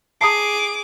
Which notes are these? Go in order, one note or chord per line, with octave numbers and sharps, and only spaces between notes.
G#4 A5 A#5 D6 D#6 C7